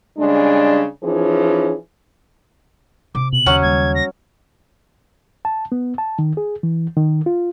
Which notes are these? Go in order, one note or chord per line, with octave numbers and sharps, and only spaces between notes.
C#3 G3 G#3 D4
E3 F3 C#4 D#4 G#4
C3 D6
B2 F#7
D#2 C#3 F#3 C#4
G3 A#3 G#6
A#6
A5
B3
A5
D#3
G#4
E3
D#3
F4